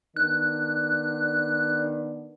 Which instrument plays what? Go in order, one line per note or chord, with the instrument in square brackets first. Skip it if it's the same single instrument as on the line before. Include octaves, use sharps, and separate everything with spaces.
[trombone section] D#3 B3 D4 [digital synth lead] F#6